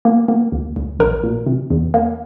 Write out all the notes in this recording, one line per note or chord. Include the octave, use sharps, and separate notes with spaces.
A#3
A#3
D2
D2
A#1 A#4
A#2
C3
E2
A#3